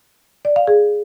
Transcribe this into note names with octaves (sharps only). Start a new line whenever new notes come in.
D5
F5
G#4